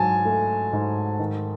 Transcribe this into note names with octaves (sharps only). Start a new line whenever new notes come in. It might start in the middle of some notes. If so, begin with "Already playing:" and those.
Already playing: G#2 F#3 G#5 A5
A3
G#2
D#3